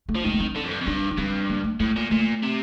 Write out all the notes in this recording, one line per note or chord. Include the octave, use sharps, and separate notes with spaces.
A3
F3
D#3 A3
A#3
C4
D3
F2
G2
F2
G2 D4
D4
G2 C4
A#3
A3
A2 A3
A#2
A#2 A3
C3